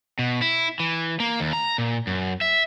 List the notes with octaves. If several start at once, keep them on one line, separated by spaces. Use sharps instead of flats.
B2
E4
E3
A#3
D#2
A#5
A#2
F#2
E5